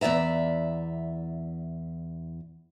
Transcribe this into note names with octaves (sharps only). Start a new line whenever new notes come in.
E2 G2 D5 E5 A#5